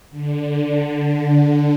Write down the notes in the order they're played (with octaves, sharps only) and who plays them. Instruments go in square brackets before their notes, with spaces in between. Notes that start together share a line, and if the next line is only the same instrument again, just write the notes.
[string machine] D3